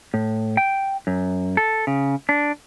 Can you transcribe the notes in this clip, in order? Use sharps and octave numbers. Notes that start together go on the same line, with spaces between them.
A2
G5
F#2
A4
C#3
D4